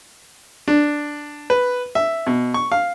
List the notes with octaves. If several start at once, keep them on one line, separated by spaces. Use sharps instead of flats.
D4
B4
E5
B2
C#6
F5